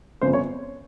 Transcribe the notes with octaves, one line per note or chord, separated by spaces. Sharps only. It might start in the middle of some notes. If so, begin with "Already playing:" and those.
G1 F2 C#3 C5
C#5